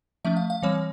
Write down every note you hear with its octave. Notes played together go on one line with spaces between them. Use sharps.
F3 A3 C#4 E5
F5
F5
E3 G3 C4 C#5